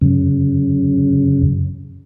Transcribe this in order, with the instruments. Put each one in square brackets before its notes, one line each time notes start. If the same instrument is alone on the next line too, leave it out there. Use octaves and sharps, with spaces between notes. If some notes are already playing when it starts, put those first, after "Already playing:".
[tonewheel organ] F#2 C#3